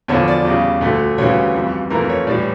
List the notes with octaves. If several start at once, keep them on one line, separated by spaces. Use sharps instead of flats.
E2 D3 F3 C#5
D5
E2 C#3 G3
D2 D3 A3
D2 C#3 E3 G3 C#5
F2 E3 G3
F2 E3 A3 A#4
A#4
C#5
A2 E3 G3 D5